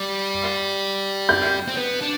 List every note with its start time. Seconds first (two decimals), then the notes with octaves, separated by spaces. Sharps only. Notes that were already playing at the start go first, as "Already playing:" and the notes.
Already playing: G3
1.29 G6
1.68 C4
1.77 B3
2.01 D4